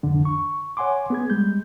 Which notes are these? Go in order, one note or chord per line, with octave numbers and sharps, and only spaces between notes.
C2 F2 D3 D4
C#6
C#5 F#5 G#5 C6 D6
B3 G#4 G#6
G3 G#3 G6